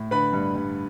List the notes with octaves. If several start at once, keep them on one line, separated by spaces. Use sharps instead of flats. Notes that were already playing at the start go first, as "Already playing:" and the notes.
Already playing: A2
D3 B4 B5
G2
G2